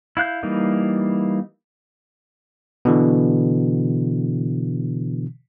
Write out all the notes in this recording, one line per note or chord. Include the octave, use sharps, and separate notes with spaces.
E4 F5 F#6 G6
E3 G3 A#3 D#4
B2 D3 E3